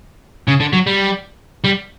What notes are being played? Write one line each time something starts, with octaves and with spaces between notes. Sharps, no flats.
C#3
D3
F#3
G3
G3